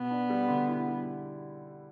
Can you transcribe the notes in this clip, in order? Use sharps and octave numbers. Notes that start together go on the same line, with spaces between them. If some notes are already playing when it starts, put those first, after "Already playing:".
Already playing: B2 B3
D4
G3
D3
E4
G3